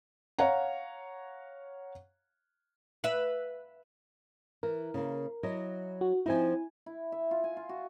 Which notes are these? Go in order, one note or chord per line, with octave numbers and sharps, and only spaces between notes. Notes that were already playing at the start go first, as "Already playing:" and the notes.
C#5 F5 F#5 A#5
B4 E5
E3 A#4
C#3 A#3
F#3 E4 D#5
F#4
F3 C4 D#4 E4 G#5
E4
E5
F4
G#5
F4
F#4